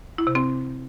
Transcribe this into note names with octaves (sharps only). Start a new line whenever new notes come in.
E4
C3
C4